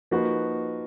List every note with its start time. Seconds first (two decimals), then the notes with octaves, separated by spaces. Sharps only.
0.11 F3 A#3 D#4 F#4 B4